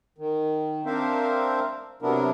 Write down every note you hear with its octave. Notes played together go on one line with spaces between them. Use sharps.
D#3
C4 D4 A#4 C5 E5 F5
C3 F#3 B3 D4 E4 A#4